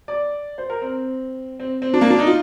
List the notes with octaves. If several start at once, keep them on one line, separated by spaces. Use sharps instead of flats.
D5
C5
A#4
C4
C4
C4
D4
A#3
D4
D#4
F4